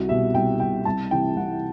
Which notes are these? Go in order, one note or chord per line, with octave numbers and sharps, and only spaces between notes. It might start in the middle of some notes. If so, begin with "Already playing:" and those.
Already playing: C2 F#4
B2 G3 E5
C2 G5
B2 G3 G5
C2 A5
C3 E3 G5
C2 F#5